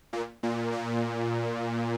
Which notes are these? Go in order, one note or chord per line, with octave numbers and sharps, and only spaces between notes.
A#2
A#2
A#2